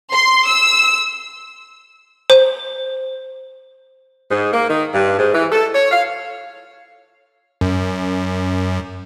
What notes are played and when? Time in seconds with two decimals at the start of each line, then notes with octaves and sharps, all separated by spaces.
0.14 C6
0.47 E6
2.30 C5
4.29 G#2
4.52 A#3
4.68 D#3
4.93 G2
5.17 G#2
5.33 E3
5.50 A4
5.73 C#5
5.91 F5
7.61 F#2